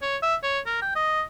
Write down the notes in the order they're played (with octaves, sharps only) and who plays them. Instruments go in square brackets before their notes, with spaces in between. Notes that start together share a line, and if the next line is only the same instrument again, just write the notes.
[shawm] C#5
E5
C#5
A#4
G5
D#5